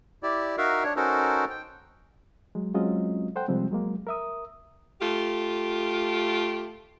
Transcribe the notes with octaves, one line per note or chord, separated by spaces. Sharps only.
E4 G4 D5
D#4 F#4 A#4 E5 F5
D4 C#5
C#4 D#4 F#4 A4 A#4 C5
G5
F#3 G#3
F#3 G#3 C4 C#4 F4 D#5
A4 C5 F#5 G5
C3 F3 G3 G#3 C4
F#3 G#3 A#3
A#4 E5 D#6
A3 F4 G4